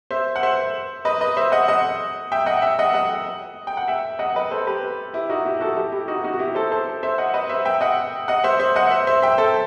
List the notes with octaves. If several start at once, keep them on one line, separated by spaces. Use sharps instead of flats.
C5 E5
F#5
C5 E5
B4 D#5
B4 D#5
C5 E5
D#5 F#5
D#5 F#5
E5 G5
D#5 F#5
E5 G5
D#5 F#5
D#5 F#5
G5
F#5
E5 G5
D#5 F#5
B4 D#5
A4 C5
G4 B4
E4 G4
D#4 F#4
E4 G4
F#4 A4
E4 G4
E4 G4
D#4 F#4
D#4 F#4
F#4
E4 G4
A4 C5
A4 C5
C5 E5
D#5 F#5
B4 D#5
C5 E5
E5 G5
D#5 F#5
D#5 F#5
C5 E5
C5 E5
D#5 F#5
C5 E5
C5 E5
E5 G5
A4 C5